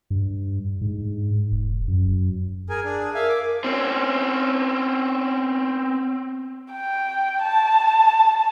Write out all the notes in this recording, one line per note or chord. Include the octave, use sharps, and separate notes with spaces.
G2
G#2
E1
F#2
G#4 A#4 G#5
D4 G#4
A#4 E5 F5 G#5
D6
C4 C#4
G5
A5